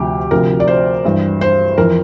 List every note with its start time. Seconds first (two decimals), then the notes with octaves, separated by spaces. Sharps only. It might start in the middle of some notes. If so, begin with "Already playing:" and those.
Already playing: D2 C3 F3 G4
0.31 D2 C3 F3 A#4
0.60 D5
0.67 C5
1.05 G2 E3
1.41 C5
1.78 F2 E3 A#4